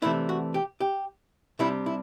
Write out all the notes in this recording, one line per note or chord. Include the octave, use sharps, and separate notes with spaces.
C3 E3 A3 D4 E4
F#4
G4
G4
C3 G3 D4 E4
E4